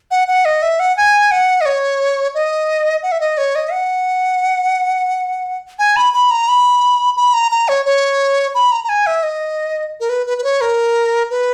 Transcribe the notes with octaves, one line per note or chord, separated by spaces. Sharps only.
F#5
F#5
D#5
E5
F#5
G#5
F#5
D#5
C#5
D#5
F#5
E5
D#5
C#5
D#5
F#5
G#5
B5
B5
A#5
B5
B5
A#5
A#5
C#5
C#5
B5
A#5
A#5
G#5
E5
D#5
A#4
B4
B4
B4
C#5
A#4
B4